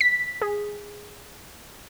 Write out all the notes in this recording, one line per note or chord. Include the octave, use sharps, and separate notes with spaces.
B6
G#4